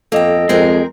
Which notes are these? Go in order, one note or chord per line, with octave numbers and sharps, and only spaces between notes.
F2 A#3 A4 D#5 G5
F2 G#3 C4 G#4 A#4